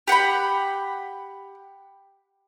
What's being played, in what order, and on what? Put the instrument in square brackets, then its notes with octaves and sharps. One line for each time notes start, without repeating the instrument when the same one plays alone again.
[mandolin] G4 F#5 G5 B5